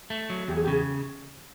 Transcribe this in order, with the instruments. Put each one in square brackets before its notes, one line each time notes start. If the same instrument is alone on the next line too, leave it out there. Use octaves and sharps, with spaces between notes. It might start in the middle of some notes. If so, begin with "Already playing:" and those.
[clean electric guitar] A3
F#3
[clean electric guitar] E2 [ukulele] G4
[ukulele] G#4
G4
[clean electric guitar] C#3 [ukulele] G#4